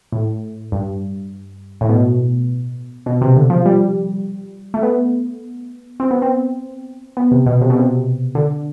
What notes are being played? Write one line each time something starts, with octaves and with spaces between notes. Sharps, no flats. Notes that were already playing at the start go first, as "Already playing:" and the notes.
A2
G2
A2
B2
B2
C3
D3
F3
G3
A3
B3
C4
B3
C4
B3
C3
B2
C3
B2
C3
D3